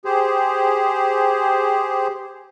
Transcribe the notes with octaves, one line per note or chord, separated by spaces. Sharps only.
G4 G#4 C5